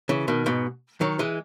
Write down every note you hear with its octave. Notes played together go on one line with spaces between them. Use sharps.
C#3 E3
B2 D#3
G#2 B2
D#3 F#3
E3 G#3